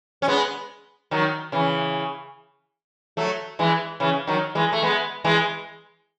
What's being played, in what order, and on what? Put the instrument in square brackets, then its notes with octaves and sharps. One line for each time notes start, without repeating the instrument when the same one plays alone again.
[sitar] C#4
G#3 B3
D#3 F#3
C#3 E3
F#3 A3
E3 G#3
C#3 E3
D#3 F#3
E3 G#3
A3
G#3 B3
E3 G#3